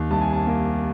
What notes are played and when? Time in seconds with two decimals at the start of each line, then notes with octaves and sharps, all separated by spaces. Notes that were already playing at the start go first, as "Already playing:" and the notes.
Already playing: D#2
0.10 C2 A5
0.21 G#5
0.33 A5
0.46 A#3